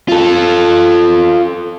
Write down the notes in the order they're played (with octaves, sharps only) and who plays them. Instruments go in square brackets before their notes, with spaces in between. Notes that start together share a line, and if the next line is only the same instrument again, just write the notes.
[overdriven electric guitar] F4 A4